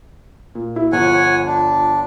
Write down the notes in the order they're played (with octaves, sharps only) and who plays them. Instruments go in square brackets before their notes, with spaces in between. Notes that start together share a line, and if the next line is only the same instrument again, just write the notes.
[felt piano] A#2
E4
[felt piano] G1 F3 [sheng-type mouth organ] C#5 F#5 G#5
[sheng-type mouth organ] D4